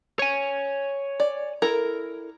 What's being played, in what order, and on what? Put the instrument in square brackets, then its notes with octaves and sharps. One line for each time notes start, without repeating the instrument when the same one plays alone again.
[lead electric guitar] C#5 G#5
[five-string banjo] D5
E4 A4 A#4